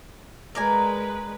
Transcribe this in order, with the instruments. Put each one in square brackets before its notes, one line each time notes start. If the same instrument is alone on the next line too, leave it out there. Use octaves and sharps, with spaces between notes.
[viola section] G#3 B4 [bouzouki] A#4 D5 G#5